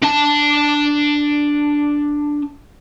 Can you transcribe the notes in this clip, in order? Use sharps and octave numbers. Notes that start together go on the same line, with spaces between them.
D4 A5